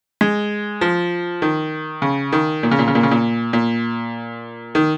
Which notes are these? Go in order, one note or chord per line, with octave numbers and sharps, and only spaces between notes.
G#3
F3
D#3
C#3
D#3
A#2
C#3
A#2
C#3
A#2
C#3
A#2
A#2
D#3